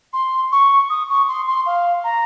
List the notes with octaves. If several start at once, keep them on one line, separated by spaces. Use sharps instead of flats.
C6
C#6
D#6
C#6
C6
C6
F5
A#5